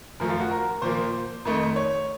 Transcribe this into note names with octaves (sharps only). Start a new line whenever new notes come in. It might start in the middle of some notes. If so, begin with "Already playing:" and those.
F#2 F3 A3 A#4
F4
F#4
A#4
A#2 F3 A#3 C5
F2 D#3 A3
C#5